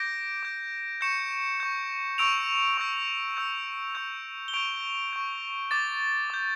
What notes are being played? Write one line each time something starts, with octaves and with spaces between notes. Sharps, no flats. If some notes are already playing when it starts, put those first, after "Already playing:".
Already playing: D6 G6 A#6 D7
D6 G6
C#6 G6 C#7 E7
C#6 G6
C#6 E6 G6 D7 F7
C#6 E6 G6
C#6 E6 G6
C#6 E6 G6
G7
C#6 G6 D7 F7
C#6 G6
D6 G6 A6
D6 G6